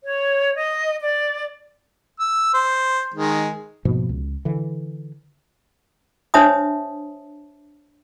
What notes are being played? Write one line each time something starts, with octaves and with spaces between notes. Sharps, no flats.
C#5
D#5
D5
E6
C5
D#3 G#3
G#2 B2 F3 A#3
C#2
D3 E3
D4 C5 C#5 E5 A5 D#6